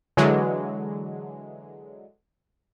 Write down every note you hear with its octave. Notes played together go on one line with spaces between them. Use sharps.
D3 E3 F#3 G#3